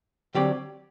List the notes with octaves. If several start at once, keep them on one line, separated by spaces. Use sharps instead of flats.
D3 F#3 C4 G4 D5